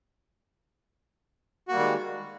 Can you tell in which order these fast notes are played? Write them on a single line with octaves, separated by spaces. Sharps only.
F#4 A#3 G3 D#3 G#3